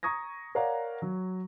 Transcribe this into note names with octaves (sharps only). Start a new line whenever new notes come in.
A#5 C#6 D#6 G#6 A#6
A#4 C#5 D5 F5 F#5 A#5
F#3